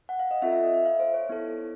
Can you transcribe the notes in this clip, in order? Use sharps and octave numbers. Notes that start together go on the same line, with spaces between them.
F#5
F5
D#5
C4 F4 A4 E5
E5
D#5
E5
F5
C5
C#5
B3 E4 A4